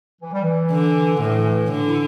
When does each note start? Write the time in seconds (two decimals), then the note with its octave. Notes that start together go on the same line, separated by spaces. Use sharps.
0.22 E3
0.33 G3
0.43 E3
0.71 D3
1.17 D3
1.21 A2 E3
1.46 E3
1.71 D3 E3
1.87 E4